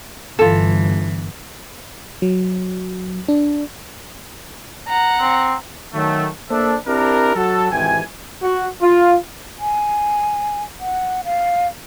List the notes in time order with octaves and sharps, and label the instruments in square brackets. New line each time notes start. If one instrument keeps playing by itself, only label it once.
[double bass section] G1 [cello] E3 [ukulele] F4 A4
[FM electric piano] F#3
D4
[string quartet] F#5 A#5
[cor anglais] C4
[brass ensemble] D#3 F#3 A3
A#3 D4 A4 C5 E5
C4 D4 E4 G4 A#4
F#3 F#4 A4
G#1 F2 C3 E3 G5 G#5
[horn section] F#4
F4
[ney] G#5
F#5
F5